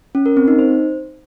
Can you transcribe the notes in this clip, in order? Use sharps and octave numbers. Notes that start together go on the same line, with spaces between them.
C#4
A#4
C4
D#4
C5